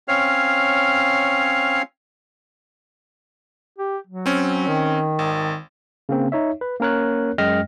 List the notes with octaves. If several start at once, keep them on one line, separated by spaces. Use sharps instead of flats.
C4 C#4 C#5 F5 F6
G4
F#3
C4 C#4
D#3
G#1
C#3 A#3 C4
D#4 C#5 E5
B4
A#3 C#4 A#4 C#5 F#6
F#2 G#3 D#5 G5 F6 A#6